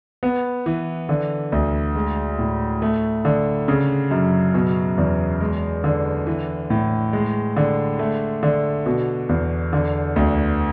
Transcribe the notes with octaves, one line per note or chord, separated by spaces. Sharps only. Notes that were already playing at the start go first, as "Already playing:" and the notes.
B3
E3
D3
D2
G#3
A2
A3
D3
C#3
F#2
B2
E2
G#3
D3
E3
A2
G#3
D3
A3
D3
B2
E2
D3
D2